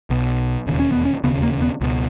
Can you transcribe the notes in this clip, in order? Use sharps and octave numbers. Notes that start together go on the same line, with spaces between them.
B1 B2
E1 D#2 C#3
C#4
B3
C#4
E1 D#2 C#3 B3
A#3
B3
C#2 B2